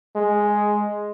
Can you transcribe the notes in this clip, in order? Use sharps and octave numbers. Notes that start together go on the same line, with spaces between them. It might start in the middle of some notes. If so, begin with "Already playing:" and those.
G#3